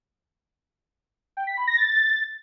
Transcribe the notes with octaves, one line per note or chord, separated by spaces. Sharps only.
G5
B6
B5
A#6
A6